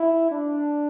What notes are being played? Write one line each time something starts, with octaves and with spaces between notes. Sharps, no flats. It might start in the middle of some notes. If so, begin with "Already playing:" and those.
Already playing: E4
D4